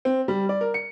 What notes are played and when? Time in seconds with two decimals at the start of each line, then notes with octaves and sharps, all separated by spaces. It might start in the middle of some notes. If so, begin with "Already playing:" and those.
0.05 C4
0.28 G3
0.49 D5
0.61 A#4
0.74 C#7